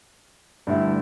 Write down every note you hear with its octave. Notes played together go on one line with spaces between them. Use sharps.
G2 D3 A3 E4